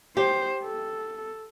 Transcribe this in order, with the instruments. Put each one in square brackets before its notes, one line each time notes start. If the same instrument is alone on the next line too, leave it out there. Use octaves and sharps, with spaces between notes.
[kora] G4 [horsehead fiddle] C5
[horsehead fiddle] A4